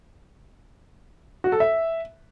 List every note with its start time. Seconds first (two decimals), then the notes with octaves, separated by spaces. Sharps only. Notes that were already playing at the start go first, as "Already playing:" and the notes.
1.44 F#4
1.52 A4
1.60 E5